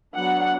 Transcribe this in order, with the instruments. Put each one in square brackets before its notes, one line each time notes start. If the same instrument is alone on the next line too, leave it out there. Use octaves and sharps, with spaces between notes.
[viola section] F#3 B3 D4 F#5